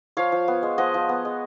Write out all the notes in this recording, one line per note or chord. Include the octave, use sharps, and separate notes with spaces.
F3 C#5 F5
F3
B3
G#3
F3 D#5 F#5
F3
B3
G#3